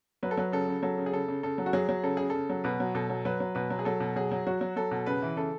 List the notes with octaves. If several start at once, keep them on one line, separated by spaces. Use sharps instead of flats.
F#3 B4
A4
F#3 B4
C#3 A4
C#3
F#3 A4
C#3
G#4
C#3 A4
C#3
C#3 A4
F#3
F#4
F#3 G#4
F#3
C#3 A4
C#3 G#4
C#3 A4
F#3
B2 B4
F#3
B2 A4
F#3
F#3 B4
F#3
B2 B4
F#3
G#4
F#3 A4
B2
F#3 G#4
F#3
F#3 F#4
F#3
F#3 A4
B2
C#3 B4
E3
C#3 A4